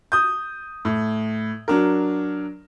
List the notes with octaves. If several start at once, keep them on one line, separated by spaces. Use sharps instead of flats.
D#6 G6
A2
F#3 D4 A#4